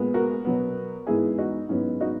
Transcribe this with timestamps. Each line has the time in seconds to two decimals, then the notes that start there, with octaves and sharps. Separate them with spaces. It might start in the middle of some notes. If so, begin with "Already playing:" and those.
Already playing: A#2 G#3 B3
0.14 F#4 A#4
0.45 B2 F#3 B3
1.07 G#2 E3 G#3 B3 E4 G#4
1.38 D#4 F#4
1.69 G#2 F#3 B3 C#4 E4
2.01 D#4 F#4